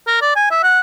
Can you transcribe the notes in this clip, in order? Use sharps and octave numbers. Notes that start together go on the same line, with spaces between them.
A#4
D5
G#5
E5
F#5